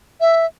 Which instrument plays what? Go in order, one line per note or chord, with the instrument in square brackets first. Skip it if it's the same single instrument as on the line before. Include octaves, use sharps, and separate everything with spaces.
[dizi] E5